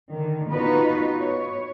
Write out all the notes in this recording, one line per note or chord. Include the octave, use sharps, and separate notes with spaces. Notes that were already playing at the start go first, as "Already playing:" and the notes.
D3 D#3
B3 D#4 F4 F#4 B4
C#5